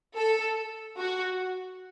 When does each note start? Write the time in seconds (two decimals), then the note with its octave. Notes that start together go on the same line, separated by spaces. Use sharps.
0.17 A4
0.97 F#4